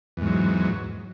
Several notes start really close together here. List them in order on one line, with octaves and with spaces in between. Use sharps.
E2 G#2 F#3